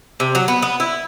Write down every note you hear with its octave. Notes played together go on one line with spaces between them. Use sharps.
C3
F#3
B3
B3
E4